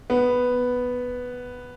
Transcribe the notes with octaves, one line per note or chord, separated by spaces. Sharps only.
B3